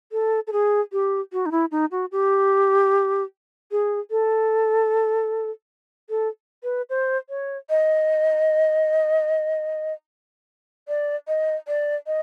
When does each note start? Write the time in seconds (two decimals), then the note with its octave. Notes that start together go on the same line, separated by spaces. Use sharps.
0.12 A4
0.47 A4
0.53 G#4
0.93 G4
1.33 F#4
1.46 D#4
1.51 E4
1.71 D#4
1.91 F#4
2.12 G4
3.71 G#4
4.11 A4
6.10 A4
6.63 B4
6.90 C5
7.29 C#5
7.70 D#5
10.88 D5
11.28 D#5
11.68 D5
12.07 D#5